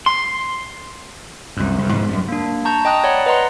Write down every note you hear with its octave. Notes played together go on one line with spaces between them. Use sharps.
C6
C2 F#2
C2 F#2
G#2 B2 F3
F#2 G3
A#3 D4
A5 A#5 C#6 G6
D#5 G5 A#5 D#6 F#6
C#5 D5 F#5 B5
B4 D#5 F#5 A#5 C6